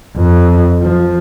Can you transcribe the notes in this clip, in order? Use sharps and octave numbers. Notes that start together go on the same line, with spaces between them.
F2
F3